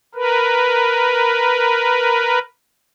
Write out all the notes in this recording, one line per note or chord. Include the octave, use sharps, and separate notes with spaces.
A#4 B4